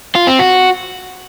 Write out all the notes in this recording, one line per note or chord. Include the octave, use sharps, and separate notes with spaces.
F4
C4
F#4